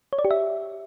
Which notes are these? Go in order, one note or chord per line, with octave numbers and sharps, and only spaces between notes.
C#5
D5
G4
E5